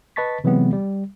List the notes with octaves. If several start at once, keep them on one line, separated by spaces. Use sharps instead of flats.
B4 D#5 A5 C#6 A6 B6
C3 E3 F#3 G#3 B3 C4
G3